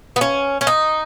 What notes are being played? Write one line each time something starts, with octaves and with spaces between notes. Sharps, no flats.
B3
C#4
C#4
D#4